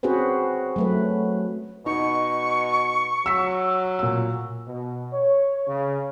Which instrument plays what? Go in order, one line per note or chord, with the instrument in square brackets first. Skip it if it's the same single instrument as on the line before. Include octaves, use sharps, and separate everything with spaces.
[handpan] C4 C#4 F#4 G#4 B4 C5
F#3 A3 B4
[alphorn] B2 [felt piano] D#4 [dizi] C#6
[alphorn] F#3 [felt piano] E6 B6
[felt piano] A#2 E6
[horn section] B2
C#5
C#3